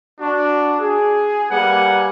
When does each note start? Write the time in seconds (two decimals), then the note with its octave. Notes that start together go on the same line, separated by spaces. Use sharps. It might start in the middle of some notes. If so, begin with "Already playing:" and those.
0.20 D4 F#4
0.79 G#4
1.50 G3 A#3 B4 F#5 G#5